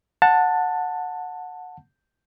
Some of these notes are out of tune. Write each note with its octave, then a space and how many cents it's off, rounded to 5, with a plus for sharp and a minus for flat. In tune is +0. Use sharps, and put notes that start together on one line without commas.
F#5 -15 A5 +10